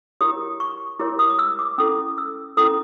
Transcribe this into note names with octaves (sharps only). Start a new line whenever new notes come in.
E4 G4 A#4 C#5 D#6
C#6
E4 G4 A#4 C#5 D6
D#6
D#6
E6
D6
C#4 E4 A4 D#6
E6
C#4 E4 A4 D#6